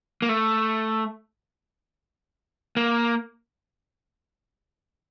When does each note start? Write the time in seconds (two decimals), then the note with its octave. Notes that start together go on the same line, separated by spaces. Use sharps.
0.22 A#3
0.29 A3
2.77 A#3